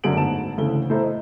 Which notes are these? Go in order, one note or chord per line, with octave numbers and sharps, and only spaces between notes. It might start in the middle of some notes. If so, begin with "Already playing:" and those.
F#2 D3 F#3 G#4 D7 F#7
D2 G#2 B3 A5 E7
D2 C#3 E3 A4 G7
A2 A4 C5 E5 A#5
D#5